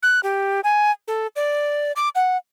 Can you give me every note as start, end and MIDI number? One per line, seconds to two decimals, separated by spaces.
0.03 0.20 90
0.23 0.60 67
0.64 0.91 80
1.08 1.27 69
1.36 1.92 74
1.96 2.09 86
2.15 2.37 78